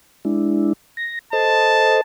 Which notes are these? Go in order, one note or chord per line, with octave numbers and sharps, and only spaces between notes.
G#3 D4 E4
A#6
A4 C5 D#5 A5